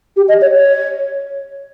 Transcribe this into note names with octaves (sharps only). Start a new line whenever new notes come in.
G4
D#5
C#5
C#5